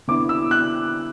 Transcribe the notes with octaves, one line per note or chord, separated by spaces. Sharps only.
D3 B3 E4 D6
E6
F#6